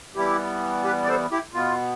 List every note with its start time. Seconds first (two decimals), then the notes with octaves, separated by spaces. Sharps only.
0.16 E3 G3 B3 E4 G4
0.84 G4 B4
1.04 D5
1.09 A4 C5
1.31 E4 G4
1.54 B2 B3 F4